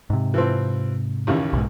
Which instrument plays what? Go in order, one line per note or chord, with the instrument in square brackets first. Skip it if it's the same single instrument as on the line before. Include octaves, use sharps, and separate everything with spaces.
[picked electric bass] G#2 C3
[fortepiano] E3 F3 C4
A1 D#2 C#3
[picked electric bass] B1 G#2